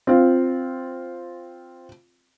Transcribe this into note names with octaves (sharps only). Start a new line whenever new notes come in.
C4 F4